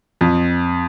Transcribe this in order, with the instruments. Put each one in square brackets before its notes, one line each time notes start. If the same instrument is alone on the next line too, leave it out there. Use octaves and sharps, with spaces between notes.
[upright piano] F2